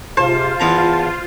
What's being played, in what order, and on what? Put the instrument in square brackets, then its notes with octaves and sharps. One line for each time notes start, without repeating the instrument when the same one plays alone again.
[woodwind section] G#2 C3 [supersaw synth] F4 [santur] C5 [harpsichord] A5
[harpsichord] E2 B3 A#5 [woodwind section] A5